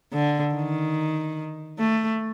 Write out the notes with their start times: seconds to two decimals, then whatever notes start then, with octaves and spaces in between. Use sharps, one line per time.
0.13 D3
0.55 D#3
1.79 A3